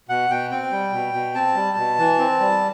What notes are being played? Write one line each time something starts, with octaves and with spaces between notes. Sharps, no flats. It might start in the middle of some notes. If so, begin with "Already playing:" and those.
B2 F#5
B2 G5
C4 G5
G3
B2
B2
C4 A5
G3
B2
E3
C4
G3